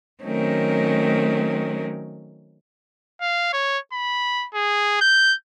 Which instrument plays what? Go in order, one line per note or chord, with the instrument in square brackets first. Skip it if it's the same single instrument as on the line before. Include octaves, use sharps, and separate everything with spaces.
[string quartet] D#3 F#3 A3 C4 C#4 A#4
[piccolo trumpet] F5
C#5
B5
G#4
G6